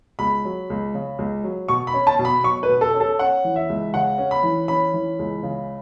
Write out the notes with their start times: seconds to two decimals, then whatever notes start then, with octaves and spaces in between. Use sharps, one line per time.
0.19 C#2 B5
0.45 F#3
0.70 C#2
0.94 C#3
1.19 C#2
1.44 F#3
1.68 B2 C#6
1.87 B5
1.94 C#4
2.07 A5
2.19 B2
2.25 B5
2.44 F#3 C#6
2.63 B4
2.69 B2
2.81 A4
2.94 C#4
3.00 A4
3.19 C#4 F#5
3.44 E3
3.56 E5
3.69 C#2
3.94 C#3 F#5
4.18 C#4
4.31 B5
4.43 E3
4.68 C#4 B5
4.94 E3
5.19 C#2
5.43 C#3